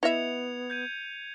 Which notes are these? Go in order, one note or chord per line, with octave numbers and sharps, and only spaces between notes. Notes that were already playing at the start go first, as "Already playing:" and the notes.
B3 E4 D#5 E5 G#6 C#7 F7
G6 G#6 D#7